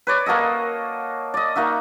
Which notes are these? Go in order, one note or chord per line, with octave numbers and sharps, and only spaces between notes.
B4 C#5 D5
A#3 F#4 A4 D#5
D5 D#5
A#3 D#4 F#4 E5